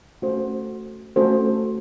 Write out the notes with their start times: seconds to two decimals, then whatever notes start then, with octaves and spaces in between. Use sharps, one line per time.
0.22 A3 C#4 F#4 A4 C5
1.16 A3 C#4 F#4 A4 C5